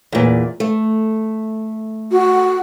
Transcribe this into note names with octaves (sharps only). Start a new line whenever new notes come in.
E2 A#2
A3
F#4